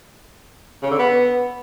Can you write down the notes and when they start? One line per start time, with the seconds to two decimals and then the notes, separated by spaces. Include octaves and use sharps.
0.83 C#3
0.91 D3
0.99 B3